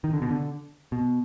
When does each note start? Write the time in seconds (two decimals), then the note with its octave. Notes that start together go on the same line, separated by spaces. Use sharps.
0.04 D#3
0.13 D3
0.22 B2
0.31 D3
0.92 B2